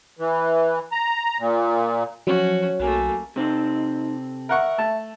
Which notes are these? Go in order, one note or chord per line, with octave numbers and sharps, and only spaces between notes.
E3
A#5
A#2
F3 F#3 C#4 F#4 C#5
B1 A3 A#3 F#4 G#5
C3 C4 D#4 A4
A#4 E5 F#5 C#6
A3 A5